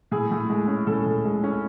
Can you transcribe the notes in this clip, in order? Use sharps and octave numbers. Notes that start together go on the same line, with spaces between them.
A2 G#4
A2
G#3
C#4
A2 A4
A2
G#3
C#4